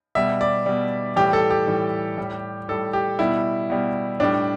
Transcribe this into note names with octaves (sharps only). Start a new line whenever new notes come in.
B2 G3 E5
D5
B2 G3
A2 E3 G3 G4
A4
G4
A2 E3 G3
A2 G3
A2 G3 A4
G4
B2 G3 E4
B2 G3
A2 G3 D4